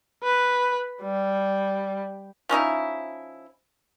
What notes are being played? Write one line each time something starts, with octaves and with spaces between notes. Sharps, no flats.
B4
G3
F3 C#4 D#4 E4